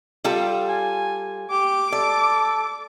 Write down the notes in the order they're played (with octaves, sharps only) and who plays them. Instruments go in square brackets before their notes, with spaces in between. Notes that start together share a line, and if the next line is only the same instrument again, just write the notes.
[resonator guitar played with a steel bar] G3 F4 A4
[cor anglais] G#5
[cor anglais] G4 [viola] D6
[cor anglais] A4 [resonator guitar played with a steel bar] D5